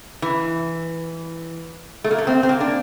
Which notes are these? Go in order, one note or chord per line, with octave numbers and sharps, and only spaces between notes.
E3
A3
A#3
A3
C4
C4
A#3
D4